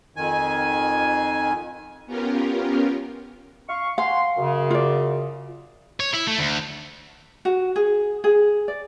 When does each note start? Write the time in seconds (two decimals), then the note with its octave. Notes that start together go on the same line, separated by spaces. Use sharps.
0.16 F2 D#3 G#5
2.06 B3 C#4 F4 G4 A#4
3.68 F5 C#6
3.98 F5 F#5 G#5 C6
4.37 F#2 C#3
4.70 F4 D5
6.00 C#5
6.14 E4
6.27 A3
6.38 D2
7.45 F#4
7.76 G#4
8.24 G#4
8.68 D5